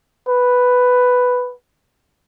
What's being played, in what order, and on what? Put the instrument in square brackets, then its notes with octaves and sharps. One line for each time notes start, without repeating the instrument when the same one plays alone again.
[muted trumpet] B4